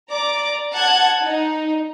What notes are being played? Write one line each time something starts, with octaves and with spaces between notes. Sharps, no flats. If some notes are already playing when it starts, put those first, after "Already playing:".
D5 A#5 D6
F#5 A5 F#6 G#6
D#4